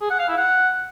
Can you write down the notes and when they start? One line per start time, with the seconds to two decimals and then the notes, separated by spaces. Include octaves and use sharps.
0.01 G#4
0.10 F#5
0.19 F5
0.28 E4
0.38 F#5